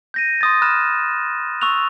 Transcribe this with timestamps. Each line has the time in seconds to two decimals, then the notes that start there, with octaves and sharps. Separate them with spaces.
0.14 G6 A#6 D#7
0.41 C6 D#6 A6
0.62 B5 F6 F#6 A6 E7
1.61 C#6 E6 F#6 F7